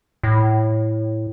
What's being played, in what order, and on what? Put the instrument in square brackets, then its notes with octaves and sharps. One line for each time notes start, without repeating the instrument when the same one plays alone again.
[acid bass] A2